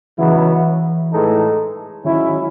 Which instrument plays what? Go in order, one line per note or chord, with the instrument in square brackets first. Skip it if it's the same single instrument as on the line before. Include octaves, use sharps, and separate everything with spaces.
[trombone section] C#2 C#3 F#3 B3 E4 [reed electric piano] E3
[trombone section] A2 E3 G#3 D#4 A4
[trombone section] G#2 F#3 C#4 E4 [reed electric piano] D#3